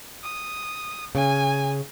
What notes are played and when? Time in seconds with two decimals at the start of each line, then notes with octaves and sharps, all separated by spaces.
0.23 D#6
1.15 C#3 G#5